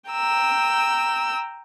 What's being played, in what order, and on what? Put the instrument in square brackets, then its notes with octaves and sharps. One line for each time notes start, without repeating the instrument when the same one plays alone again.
[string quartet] G5 A#5 E6